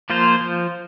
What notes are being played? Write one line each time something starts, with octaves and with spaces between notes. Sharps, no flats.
F3 A#3 F4 C5
F3